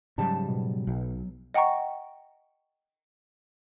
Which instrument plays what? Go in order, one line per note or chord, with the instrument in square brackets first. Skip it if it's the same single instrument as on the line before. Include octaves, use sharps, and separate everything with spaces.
[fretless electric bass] G#2 C#3 G3 [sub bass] F#3 [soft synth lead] A5
[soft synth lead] B2
[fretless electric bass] B1
[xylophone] D#5 F#5 G5 A#5 C#6